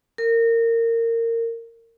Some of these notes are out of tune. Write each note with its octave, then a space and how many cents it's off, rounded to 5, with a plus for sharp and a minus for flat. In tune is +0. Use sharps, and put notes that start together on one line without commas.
A#4 -25